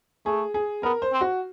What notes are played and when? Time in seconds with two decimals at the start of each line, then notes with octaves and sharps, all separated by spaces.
0.26 A3 G#4
0.54 G#4
0.83 B3 A#4
1.02 C5
1.13 C4
1.21 F#4